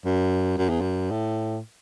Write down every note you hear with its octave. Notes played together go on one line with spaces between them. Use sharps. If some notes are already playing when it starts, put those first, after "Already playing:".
F#2
F#2
E2
F#2
A2